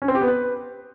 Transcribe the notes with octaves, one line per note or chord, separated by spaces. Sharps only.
C#4
C4
G4
B3
B4